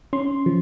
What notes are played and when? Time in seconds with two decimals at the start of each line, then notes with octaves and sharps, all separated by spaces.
0.13 C#4 C6
0.46 F3